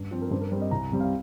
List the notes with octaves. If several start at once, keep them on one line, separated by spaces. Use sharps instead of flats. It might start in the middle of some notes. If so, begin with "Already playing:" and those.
Already playing: G2
F3 C4
A#4
G2 C5
A#4
G3 C4 C5
D#5
C2 A#5
C3 G3 C4
F5